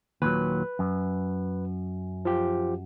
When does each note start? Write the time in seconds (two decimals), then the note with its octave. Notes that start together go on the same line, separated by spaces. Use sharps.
0.22 D#2 A#2 F#3 B4
0.79 F#2
2.25 F3 F4 G4